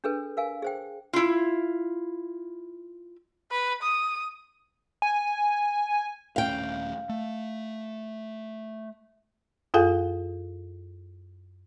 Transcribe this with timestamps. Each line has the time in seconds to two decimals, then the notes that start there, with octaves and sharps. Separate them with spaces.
0.04 D4 G#4 A4 B4
0.37 A#4 F5 G#5
0.62 G#4 C5 G5
1.13 E4 F4
3.52 B4
3.82 D#6
5.02 G#5
6.36 D#1 A3 C#4 F5 G5
7.09 A3
9.74 F#2 F4 G#4 A4 F5 G#5